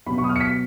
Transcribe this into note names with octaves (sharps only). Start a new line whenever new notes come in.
B2 F#3 B3 B5
C#6
D#6
F6
C#7
B6